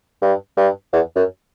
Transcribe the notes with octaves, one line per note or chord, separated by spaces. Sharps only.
G2
G2
E2
F#2